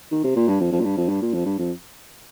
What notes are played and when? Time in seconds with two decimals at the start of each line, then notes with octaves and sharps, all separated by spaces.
0.12 D#3
0.24 C3
0.36 A#2
0.48 G2
0.60 F2
0.72 F2
0.80 A#2
0.85 G2
0.97 F2
1.09 G2
1.22 A#2
1.33 F2
1.46 G2
1.58 F2